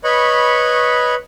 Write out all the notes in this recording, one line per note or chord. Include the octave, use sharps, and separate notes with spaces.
B4 C#5 D#5 B5 C#6